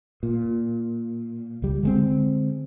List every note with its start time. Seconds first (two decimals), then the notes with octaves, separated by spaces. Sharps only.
0.23 A#2
1.62 C#2 G3
1.83 D3 G#3 C4